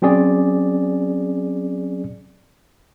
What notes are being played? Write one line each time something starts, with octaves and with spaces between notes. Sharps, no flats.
F#3 C4 C#4 G#4 D5